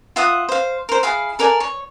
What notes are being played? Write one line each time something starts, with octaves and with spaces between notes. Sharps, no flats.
F4 E5 F#5 D#6
C5 F5
A#4 C5
E4 G#4 F5
A4 A#4 D5 G#5
C#5